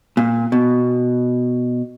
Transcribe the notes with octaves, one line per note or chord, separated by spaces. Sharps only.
A#2
B2